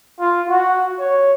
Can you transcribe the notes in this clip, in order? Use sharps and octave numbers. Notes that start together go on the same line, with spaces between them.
F4
F#4
C#5